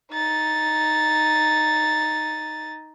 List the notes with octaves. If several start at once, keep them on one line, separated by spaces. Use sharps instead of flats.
D#4 A6